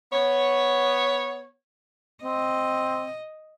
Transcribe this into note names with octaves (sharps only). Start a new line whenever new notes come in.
B3 C#5
C4 D#5